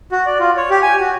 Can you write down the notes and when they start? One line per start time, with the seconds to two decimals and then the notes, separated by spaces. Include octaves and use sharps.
0.12 F#4
0.26 D5
0.40 F4
0.57 C#5
0.70 G4
0.83 G#5
1.00 F#4